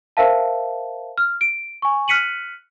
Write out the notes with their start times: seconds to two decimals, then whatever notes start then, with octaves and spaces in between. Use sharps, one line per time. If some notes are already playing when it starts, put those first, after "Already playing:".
0.17 A#4 C5 E5 F5 A5
1.18 F6
1.41 D7
1.82 G#5 C#6
2.08 F6 F#6 B6 C#7 D#7 F#7